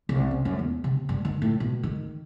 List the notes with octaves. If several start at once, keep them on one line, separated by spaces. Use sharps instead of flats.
C2
C#4
F#2
E2
C3
G2
D#3
A2
B2
D#3